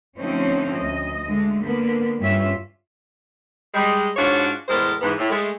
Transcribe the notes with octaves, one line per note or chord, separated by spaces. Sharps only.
D3 F3 A3 C4 C#4 D#4
D2 D#5
D3 G#3 A3
D3 A#3 B3
G2 G3 C#4 F4 E5
G3 G#3
G#2 D4 F4 F#4 C#5
E2 A2 G#3 A4 A#4 C5
G#2 E3 B3
A2
G#3 A3